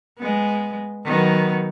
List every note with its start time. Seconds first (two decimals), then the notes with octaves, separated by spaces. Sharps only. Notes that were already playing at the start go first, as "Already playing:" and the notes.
0.19 G#3 B3
1.04 D#3 F#3 B3